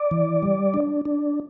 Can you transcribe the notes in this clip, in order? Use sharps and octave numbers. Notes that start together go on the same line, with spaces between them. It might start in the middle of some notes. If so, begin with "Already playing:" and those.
Already playing: D5
E3
G3
D4
D4